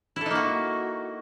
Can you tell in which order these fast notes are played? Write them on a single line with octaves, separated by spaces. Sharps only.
E4 A4 D#4 A#3 F#4